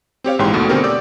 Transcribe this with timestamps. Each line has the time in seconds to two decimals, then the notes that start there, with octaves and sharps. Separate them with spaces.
0.24 C4 G4 C#5 F5
0.39 A#1 G#2 E3 C#5 G5 C6
0.53 D#2 B2 A3 B3
0.69 B2 D3 C4 C#4 G4 A#4
0.84 D5 D6 E6 G6